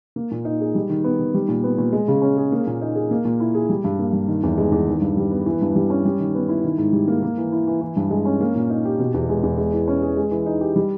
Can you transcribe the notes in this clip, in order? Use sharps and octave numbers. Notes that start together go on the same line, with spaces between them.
A#3
A#2
D#4
G#4
G3
D#3
B3
D#3
G3
A#2
B3
A#2
G#3
C#3
C#4
G#4
A#3
A#2
D#4
G#4
A#3
A#2
E4
G#4
G3
G2
A#3
G2
D#3
E2
G#3
E2
D#3
G2
G3
B3
E3
G2
G3
C#4
G3
D#3
B3
E4
D#3
G#2
G3
A#3
A#3
E3
E4
E3
E3
G2
G#3
C#4
A#3
A#2
D#4
G4
B2
E2
G#3
E2
G#3
E3
C#4
G#4
G#3
E3
D#4
G4
G3